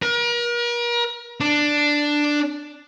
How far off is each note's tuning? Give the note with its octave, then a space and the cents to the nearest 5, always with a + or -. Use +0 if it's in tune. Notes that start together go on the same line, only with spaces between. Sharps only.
A#4 +40
D4 +5